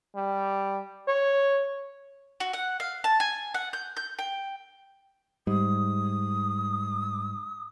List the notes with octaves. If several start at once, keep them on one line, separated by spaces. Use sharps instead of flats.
G3
C#5
F#4
F#5
F5
A5
G#5
F#5
G6
G6
G5
G#2 G3 D#6